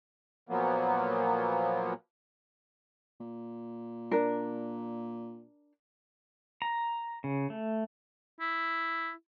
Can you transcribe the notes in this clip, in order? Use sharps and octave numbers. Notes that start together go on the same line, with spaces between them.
A#2 F3 F#3 A#3 B3
A#2
D4 A#4
A#5
C#3
A3
E4